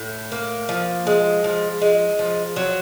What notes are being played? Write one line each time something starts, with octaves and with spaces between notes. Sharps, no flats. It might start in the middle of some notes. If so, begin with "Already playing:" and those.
Already playing: A2
A#3
F3
G#3
F3
G#3
F3
F#3